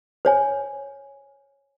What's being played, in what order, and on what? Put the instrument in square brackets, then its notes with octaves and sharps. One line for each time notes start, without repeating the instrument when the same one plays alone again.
[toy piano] C5 C#5 G#5